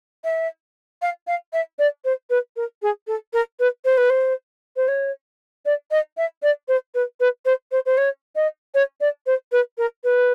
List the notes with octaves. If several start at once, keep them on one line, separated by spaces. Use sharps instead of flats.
E5
F5
F5
E5
D5
C5
B4
A#4
G#4
A4
A#4
B4
C5
B4
C5
C5
C#5
D5
D#5
E5
D5
C5
B4
B4
C5
C5
C5
C#5
D#5
C#5
D5
C5
B4
A#4
B4